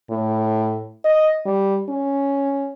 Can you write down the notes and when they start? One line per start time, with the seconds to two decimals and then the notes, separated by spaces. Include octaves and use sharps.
0.10 A2
1.05 D#5
1.46 G3
1.89 C#4